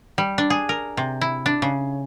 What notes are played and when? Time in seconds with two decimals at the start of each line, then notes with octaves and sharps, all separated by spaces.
0.18 G3
0.38 D4
0.50 G#4
0.69 A#4
0.97 C3
1.21 E4
1.46 D4
1.62 C#3